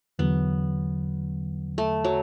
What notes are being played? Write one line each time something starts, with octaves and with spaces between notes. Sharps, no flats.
E2 D3 F#3 B3
A3
F#3